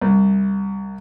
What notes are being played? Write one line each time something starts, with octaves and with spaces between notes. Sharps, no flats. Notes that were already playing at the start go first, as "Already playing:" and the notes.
C2